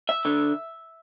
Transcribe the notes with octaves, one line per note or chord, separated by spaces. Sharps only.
E5
D3